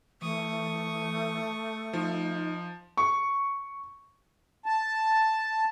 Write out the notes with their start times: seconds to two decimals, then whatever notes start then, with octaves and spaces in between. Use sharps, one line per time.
0.22 E3 A3 C#6 D#6
1.93 F3 D#4
2.97 C#6
4.66 A5